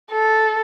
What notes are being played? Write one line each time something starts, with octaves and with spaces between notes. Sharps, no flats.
A4